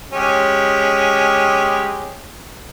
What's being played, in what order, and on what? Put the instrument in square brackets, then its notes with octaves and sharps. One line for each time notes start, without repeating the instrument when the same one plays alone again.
[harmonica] G#3 C#4 G4